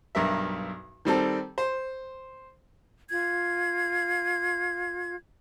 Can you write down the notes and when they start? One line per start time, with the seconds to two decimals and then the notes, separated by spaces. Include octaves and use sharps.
0.15 B1 G2 A#4 E5
1.05 D#3 G3 C4 A4
1.58 C5
3.10 F4 G#6